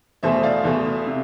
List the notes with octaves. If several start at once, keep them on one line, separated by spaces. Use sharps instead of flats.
E2 B2 A3 C5 E5
D5 F5
E2 B2 A3
C3